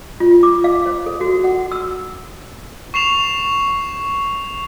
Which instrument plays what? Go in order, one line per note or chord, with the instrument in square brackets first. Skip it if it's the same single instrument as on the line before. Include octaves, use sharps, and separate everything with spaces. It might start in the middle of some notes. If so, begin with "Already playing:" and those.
[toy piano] F4
D6
F5
C5
A4
F#4
F#5
E6
[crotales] C#6 C7 E7 F7